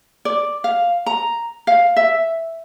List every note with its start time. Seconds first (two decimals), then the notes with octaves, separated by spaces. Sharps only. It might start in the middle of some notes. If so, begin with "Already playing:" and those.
0.25 D5
0.64 F5
1.06 A#5
1.67 F5
1.97 E5